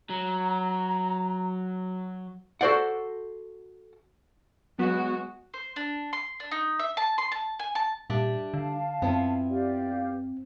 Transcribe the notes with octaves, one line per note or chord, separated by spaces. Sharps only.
F#3 A#5
F#4 A4 C5 D5 F#5
F#3 G#3 B3 F#4
C5
D4
C6
D4
D#4
E5
A5
C6
A5
G#5
A5
A#2 G3 D4 E5
D3 F5 A5
F#2 B3 C4 E4 F4
G4 D5 F5